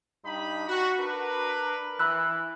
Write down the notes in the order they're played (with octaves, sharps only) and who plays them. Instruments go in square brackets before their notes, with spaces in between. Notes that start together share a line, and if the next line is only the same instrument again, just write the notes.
[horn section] G2 D#4 B5
F#4
D4 A#4 B4
[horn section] E3 [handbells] B5 E6 F#6